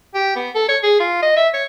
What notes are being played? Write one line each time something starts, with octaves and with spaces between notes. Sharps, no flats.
G4
B3
A4
C#5
G#4
F4
D#5
E5
C#5